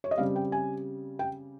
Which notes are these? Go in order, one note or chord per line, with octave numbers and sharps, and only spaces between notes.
C#5
D#5
C#3 G3 C4 F5
G5
G#5
G5